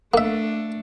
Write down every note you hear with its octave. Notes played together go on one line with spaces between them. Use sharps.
A3 A#3 D4 E5